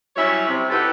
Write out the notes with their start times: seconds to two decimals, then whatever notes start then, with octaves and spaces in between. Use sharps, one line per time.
0.16 F#3 G3 C#4 E4 C#5 E5
0.47 C3
0.70 D#4 E4 F#4 G4 A4 B4